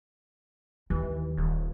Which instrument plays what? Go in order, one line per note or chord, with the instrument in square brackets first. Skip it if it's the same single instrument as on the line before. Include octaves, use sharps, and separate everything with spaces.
[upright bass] D#2 [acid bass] E3
[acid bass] D#1